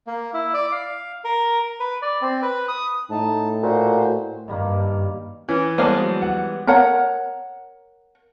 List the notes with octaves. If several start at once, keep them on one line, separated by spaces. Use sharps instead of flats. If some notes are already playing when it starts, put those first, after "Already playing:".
A#3
E4
D5
F5
A#4
B4
D5
C4
B4
D#6
A2 D#4 A5
A#2 F#4 C5
G2 D#3 G3 A#3
E3 C#4
G3 G#3 A#3 B3 C5 C#5 A5
F#3
F#5
A#4 C#5 F#5 A#5